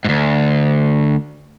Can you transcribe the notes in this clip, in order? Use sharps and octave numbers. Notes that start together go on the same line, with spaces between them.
D2 G#2